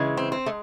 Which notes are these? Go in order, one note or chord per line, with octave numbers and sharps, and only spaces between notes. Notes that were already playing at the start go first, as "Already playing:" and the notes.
Already playing: C#3 E3 G#3
C4
C4
G#3 A3